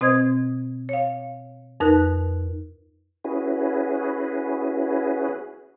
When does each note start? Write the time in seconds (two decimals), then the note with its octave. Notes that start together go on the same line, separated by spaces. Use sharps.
0.01 B2 C4 C5 D#5 D#6 G#6
0.89 C#5 F5
1.80 F2 D#4 A#4 B4 F#6
3.24 C#4 E4 F#4 G#4 B4